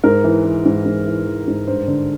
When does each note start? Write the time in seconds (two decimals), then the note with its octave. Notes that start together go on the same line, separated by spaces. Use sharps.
0.04 G#2 A#4
0.24 E3
0.45 E3
0.65 G#2
0.86 G#2
1.06 E3
1.26 E3
1.48 G#2
1.67 G2 C5
1.88 D3